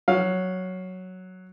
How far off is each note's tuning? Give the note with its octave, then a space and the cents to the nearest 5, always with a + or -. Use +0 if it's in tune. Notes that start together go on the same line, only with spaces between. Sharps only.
F#3 +0 F5 +15